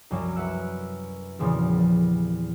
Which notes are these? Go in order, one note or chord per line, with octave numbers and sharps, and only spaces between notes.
C2 F#2 F#3 G3
B4 E5 F#5 E6
E2 A#2 C#3 F3 G3 C4
G3